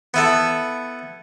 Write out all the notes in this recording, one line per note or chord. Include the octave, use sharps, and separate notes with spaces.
B3 E4 A4